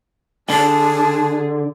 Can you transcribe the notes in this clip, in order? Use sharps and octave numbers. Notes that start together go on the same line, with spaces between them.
D3 D4 G#4 A5